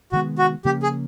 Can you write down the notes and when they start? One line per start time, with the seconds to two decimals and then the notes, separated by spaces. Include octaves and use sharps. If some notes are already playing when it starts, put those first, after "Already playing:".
0.12 C3 D#3 G#3 B3 F#4
0.38 F#4
0.65 C#3 F3 A#3 C#4 G4
0.83 G#4